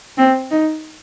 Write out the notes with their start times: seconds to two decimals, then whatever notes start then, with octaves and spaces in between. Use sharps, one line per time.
0.18 C4
0.51 D#4